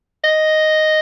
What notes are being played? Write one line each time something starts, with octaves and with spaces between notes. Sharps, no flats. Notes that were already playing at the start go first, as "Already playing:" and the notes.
D#5